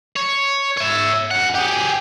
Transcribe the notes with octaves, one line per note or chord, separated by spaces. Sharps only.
C#5
C#5 E5
F#2 F#5
G4 G#4